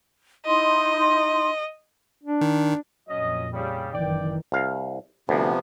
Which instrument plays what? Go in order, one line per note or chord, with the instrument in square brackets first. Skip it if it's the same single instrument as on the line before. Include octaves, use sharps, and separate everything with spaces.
[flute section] D#4 E4 C6 [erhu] D#5
[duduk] D4
[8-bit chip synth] D#3
[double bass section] F2 A#2 [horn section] F#3 C#4 D#5
[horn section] C#3 G3
[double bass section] F#1 D#3 E3 [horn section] D5 G5
[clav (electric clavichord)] C2 F5
[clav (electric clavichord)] D2 [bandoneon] C3 F3 B3